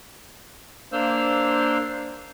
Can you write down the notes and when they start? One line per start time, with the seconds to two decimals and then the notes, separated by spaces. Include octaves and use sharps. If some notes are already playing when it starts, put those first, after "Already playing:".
0.92 A#3 D4 C5 F5 C6 E6